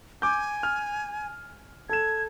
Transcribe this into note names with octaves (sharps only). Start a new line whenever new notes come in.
G#5 D6 G6
F6
A4 G#6 E7